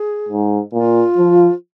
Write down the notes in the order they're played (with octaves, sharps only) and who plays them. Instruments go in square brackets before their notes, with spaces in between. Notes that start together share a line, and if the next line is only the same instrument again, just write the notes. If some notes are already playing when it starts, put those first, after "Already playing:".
Already playing: [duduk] G#4
[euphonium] G#2
[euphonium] A#2 [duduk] F4
[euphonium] F3